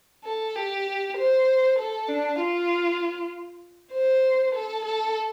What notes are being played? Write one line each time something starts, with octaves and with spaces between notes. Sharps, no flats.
A4
G4
C5
A4
D4
F4
C5
A4
A4